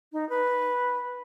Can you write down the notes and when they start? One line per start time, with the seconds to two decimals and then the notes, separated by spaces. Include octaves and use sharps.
0.13 D#4
0.29 B4